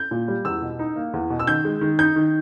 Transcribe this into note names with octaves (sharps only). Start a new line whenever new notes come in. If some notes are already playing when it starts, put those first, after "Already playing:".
Already playing: G6
A#2
G3
E2 E6
B2
D#4
A#3
E2
B2
E6
D#3 G6
G#3
D#3
D#4 G6
D#3